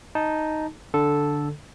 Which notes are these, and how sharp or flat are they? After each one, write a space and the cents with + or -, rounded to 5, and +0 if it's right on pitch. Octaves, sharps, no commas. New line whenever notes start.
D#4 +0 A5 +0
D3 +0 A4 -5